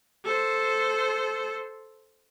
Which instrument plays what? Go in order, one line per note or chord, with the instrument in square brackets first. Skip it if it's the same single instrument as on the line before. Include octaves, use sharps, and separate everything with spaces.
[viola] A4 C5